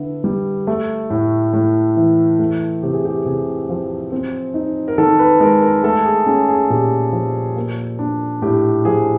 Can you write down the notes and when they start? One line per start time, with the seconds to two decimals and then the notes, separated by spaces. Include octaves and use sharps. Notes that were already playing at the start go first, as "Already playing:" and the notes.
Already playing: D3 B3 E4
0.24 G3
0.67 A3
1.10 A2
1.53 A2
1.97 E3
2.39 A3
2.83 C3 G4
2.94 G#4
3.05 G4
3.25 C3 G#4
3.69 F3
4.12 C4
4.54 D#4
4.88 A#4
4.98 D#3 A4
5.19 B4
5.40 G#3 A#4
5.62 A#4
5.83 A3 A4
6.05 G#4
6.26 C#4 G#4
6.49 G#4
6.70 A#2 G4
7.12 F3
7.56 A#3
7.99 D4
8.42 A2 G4
8.85 F3 G#4